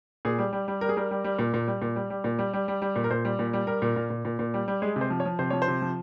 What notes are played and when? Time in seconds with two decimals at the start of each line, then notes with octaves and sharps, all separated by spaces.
0.25 A#2 G#4
0.38 G3
0.53 G3
0.68 G3
0.81 G3 A#4
0.89 G#4
0.97 G3 A#4
1.11 G3
1.24 G3
1.39 A#2
1.54 A#2
1.68 G3
1.82 A#2
1.96 G3
2.10 G3
2.24 A#2
2.39 G3
2.53 G3
2.68 G3
2.82 G3
2.96 A#2
3.04 A#4
3.10 A#2 C5
3.25 G3
3.39 A#2
3.53 G3
3.67 G3 A#4
3.82 A#2
3.96 A#2
4.10 A#2
4.25 A#2
4.39 A#2
4.54 G3
4.68 G3
4.82 G#3 G#4
4.96 C3
5.01 C5
5.10 F3
5.20 C#5
5.25 F3
5.39 C3 C5
5.50 F3 C#5
5.62 C5
5.68 C3
5.82 F3